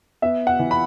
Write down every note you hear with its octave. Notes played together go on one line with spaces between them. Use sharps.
B3 E5
F#5
E3
B5